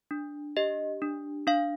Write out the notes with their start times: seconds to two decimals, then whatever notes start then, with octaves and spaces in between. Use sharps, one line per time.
0.11 D4
0.57 G4 D#5
1.02 D4
1.47 D4 F5